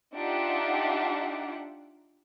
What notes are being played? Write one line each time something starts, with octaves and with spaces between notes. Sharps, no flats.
D4 D#4 F4 G4 E5 F#5